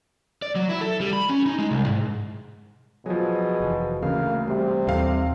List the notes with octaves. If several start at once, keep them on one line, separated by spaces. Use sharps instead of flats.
D5
F#3
E4
A4
G3
B5
C#4
D#4
G#3
C2
G#2
B2 F3 F#3 G#4
F1 E3
D2 C#3 E3 A3 A#3 F5
C3 G3
D#2 A#2 E3 C4 A4 F5